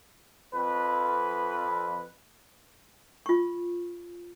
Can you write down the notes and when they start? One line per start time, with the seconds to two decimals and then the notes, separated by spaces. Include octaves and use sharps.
0.54 F2 B4
3.26 F4 C#6